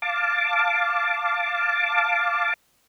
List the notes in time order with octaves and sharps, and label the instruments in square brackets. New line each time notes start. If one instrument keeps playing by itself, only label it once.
[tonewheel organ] F5 A5 D6